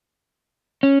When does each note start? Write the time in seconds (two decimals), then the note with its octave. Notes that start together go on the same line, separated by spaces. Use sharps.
0.83 C#4